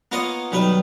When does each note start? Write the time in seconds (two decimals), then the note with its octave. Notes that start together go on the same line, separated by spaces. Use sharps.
0.12 A#3 B3 F4 C#5 D#5
0.52 B1 D#3 G3 B4